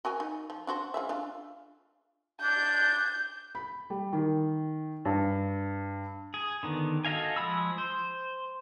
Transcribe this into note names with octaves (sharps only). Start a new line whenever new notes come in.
F#4 A#4 G#5
D#4
F3
D4 F#4 C5
F4 G#4 E5
D4 F4 F5
D4 G6
B5
G3
D#3
G2
G#4
D3 D#3 B3
F#4 A4 D#5 F5 G#5
F3 G#3 G#4 B5 E6
C5